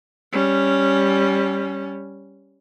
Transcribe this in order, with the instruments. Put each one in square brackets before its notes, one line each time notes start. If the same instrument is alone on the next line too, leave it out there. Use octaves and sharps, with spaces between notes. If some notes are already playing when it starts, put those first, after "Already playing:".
[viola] G3 C#4